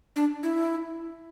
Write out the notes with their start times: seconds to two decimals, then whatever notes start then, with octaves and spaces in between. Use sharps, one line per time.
0.16 D4
0.43 E4